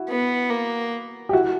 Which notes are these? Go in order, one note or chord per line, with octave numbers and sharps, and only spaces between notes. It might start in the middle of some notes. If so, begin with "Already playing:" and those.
Already playing: E4 F#4
B3
A#3
G4
E4 F#4